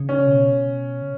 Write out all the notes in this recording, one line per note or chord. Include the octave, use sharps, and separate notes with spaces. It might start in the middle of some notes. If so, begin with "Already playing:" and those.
Already playing: C#3
C#4
B2
C#3